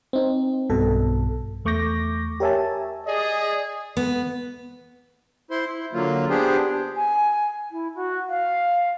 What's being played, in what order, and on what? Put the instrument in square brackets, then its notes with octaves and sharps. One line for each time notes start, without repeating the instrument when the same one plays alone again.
[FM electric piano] C4 D#4
B1 G2 B2 A4
E2 A3 C#6 D6 G6 A#6
G4 A#4 C#5 E5 G#5 A5
[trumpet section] G#4 [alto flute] D5 [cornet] D#5
[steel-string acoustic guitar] B3
[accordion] E4 C5 C6
E4
D3 F#3 A#3 F4
B3 D4 G4 G#4 C5
[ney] G#5
E4
F#4
F5